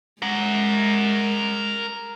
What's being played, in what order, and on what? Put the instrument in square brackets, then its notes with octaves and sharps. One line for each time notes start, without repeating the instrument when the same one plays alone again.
[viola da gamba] G#3 [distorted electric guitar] A#4 F#5